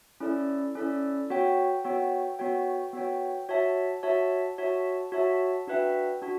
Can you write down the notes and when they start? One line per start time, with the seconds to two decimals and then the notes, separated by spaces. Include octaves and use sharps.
0.20 C#4 E4 A4 D5
0.75 C#4 E4 A4 D5
1.30 B3 F#4 C#5 G5
1.84 B3 F#4 C#5 G5
2.39 B3 F#4 C#5 G5
2.93 B3 F#4 C#5 G5
3.49 F#4 C#5 E5 A5
4.03 F#4 C#5 E5 A5
4.58 F#4 C#5 E5 A5
5.12 F#4 C#5 E5 A5
5.67 D4 F#4 B4 E5 G5
6.22 D4 F#4